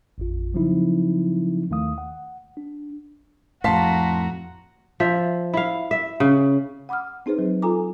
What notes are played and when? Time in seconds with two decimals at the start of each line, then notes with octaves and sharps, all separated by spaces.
0.18 A1 F2 F4
0.54 C#3 F3 F#3 C4 D#4 E4
1.70 D#2 D#3 A3 F5 D#6
1.98 F#5
2.57 D4
3.64 F2 A2 F#4 F5 A5 A#5 C6 B6
5.00 F3 E5
5.54 E4 F5
5.91 E5
6.20 C#3
6.89 F#5 B5 D6 D#6 F6
7.26 C4 D#4 G#4 B4 C5
7.39 F#3
7.62 F4 A4 G#5 A#5 D6